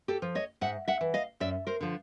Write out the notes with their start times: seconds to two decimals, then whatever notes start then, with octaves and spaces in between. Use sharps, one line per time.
0.08 G4 A4
0.22 F3
0.35 C#5 D#5
0.61 G#2 E5 F#5
0.88 E5 F#5
1.01 E3
1.14 D#5 F5
1.40 F#2 D5 E5
1.67 A#4 C5
1.81 D3 F3